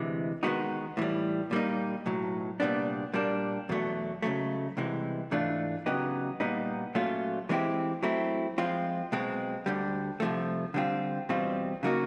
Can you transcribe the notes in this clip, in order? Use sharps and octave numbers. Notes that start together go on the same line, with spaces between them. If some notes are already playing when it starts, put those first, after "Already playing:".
Already playing: D2 C3 E3 G#3
D#3 G#3 B3 D#4 F#4
A2 E3 G3
A#2 G3 A#3 D#4
B1 A2 F#3
C2 A#2 G3 B3 D4
A#2 G3 A#3 D4
E2 B2 F#3 A3
C#2 C#3 F#3 A3
C2 C3 E3 G#3
G#2 E3 A3 D4 F4
C#3 F#3 B3 D#4 G4
A#2 G3 B3 D#4
A#2 F#3 A3 C#4 F4
E3 G#3 C4 E4 G4
F#3 A3 C4 E4
F3 G#3 C4 F4
B1 B2 G#3 C4
D2 D3 G3
C2 C3 F3 A3
D3 G3 C4 F4
E2 B2 G3 C4 F4
C#3 F#3 A#3 D#4 F#4